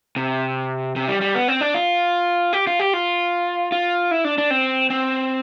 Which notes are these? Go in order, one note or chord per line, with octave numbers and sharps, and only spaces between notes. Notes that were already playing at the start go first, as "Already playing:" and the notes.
C3
C3
G3
G3
B3
C4
D4
F4
G4
F4
G4
F4
F4
E4
D4
D4
C4
C4